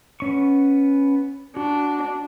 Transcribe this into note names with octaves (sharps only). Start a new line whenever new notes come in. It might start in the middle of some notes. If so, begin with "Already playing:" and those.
B3 C#4 C#6
D4 F#4